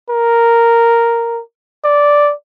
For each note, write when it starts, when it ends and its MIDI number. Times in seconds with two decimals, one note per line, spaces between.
0.10 1.42 70
1.84 2.33 74